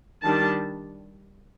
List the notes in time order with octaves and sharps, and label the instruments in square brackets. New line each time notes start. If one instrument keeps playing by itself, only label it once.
[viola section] D#3 G3 D4 A5